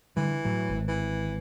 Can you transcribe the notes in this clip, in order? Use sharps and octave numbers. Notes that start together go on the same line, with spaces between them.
D3 E3 G3
A2 F#3
G#1
E3